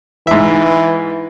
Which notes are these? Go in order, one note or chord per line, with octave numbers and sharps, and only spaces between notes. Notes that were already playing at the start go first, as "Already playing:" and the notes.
G#2 E3 E5